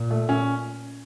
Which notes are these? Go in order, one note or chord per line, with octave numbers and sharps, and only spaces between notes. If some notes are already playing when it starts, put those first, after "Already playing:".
Already playing: A#2
A3
C#4